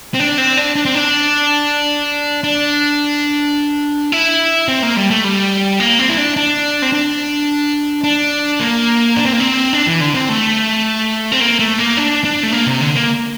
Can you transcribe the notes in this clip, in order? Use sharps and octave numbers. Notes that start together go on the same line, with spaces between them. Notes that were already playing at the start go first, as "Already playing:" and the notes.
C4
D4
C4
D4
D4
C4
D4
D4
E4
C4
A#3
G3
A3
G3
A#3
C4
E4
D4
D4
C4
D4
D4
A#3
D4
C4
A#3
C4
D4
E3
D3
C4
A3
C4
A#3
A3
A#3
D4
D4
A3
A#3
C3
D3
A#3